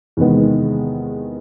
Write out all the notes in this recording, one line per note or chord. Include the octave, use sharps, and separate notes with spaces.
E2 C3 D#3 G#3 B3